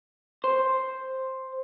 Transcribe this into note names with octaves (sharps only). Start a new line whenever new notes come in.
C5